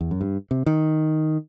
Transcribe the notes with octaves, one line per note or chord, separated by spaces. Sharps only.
E2
F#2
G2
C3
D#3